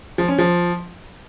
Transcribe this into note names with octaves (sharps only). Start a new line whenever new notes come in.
F3
C#4
F3